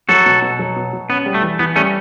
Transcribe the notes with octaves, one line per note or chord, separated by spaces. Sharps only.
F#3 F#4 A4
B2
B2
F#3
B2
B2
B3 C#4
G3
A3
E3
E3 B3
G3 A3 C#4